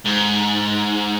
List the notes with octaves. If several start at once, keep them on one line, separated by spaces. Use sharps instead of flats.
G#2